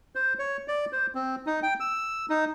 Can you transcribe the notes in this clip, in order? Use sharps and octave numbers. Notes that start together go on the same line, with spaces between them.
C5
C#5
D5
C5
C4
D#4
G5
E6
D#4